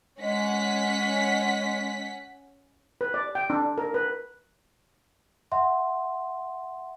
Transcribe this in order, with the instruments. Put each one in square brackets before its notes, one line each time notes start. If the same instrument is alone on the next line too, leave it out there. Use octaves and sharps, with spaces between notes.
[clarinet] G#3 [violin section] C#4 F#5 B6
[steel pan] B4
D5
G5
D4
A#4
B4
[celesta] E5 F#5 C6